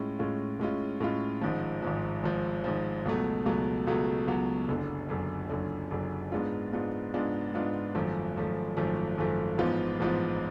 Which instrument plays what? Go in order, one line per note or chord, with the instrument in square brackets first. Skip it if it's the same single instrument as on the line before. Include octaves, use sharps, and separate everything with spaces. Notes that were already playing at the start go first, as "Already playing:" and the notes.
Already playing: [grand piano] A2 G#3 C#4 F4
A2 G#3 C#4 F4
A2 G#3 C#4 F4
A2 G#3 C#4 F4
G#1 G#2 F3
G#1 G#2 F3
G#1 G#2 F3
G#1 G#2 F3
C#2 B2 F#3 A3
C#2 B2 F#3 A3
C#2 B2 F#3 A3
C#2 B2 F#3 A3
F#1 F#2 D3
F#1 F#2 D3
F#1 F#2 D3
F#1 F#2 D3
G#2 G#3 B3 D4 F4
G#2 G#3 B3 D4 F4
G#2 G#3 B3 D4 F4
G#2 G#3 B3 D4 F4
G#1 F#2 F3 A3
G#1 F#2 F3 A3
G#1 F#2 F3 A3
G#1 F#2 F3 A3
A1 G#2 F3 B3 F4
A1 G#2 F3 B3 F4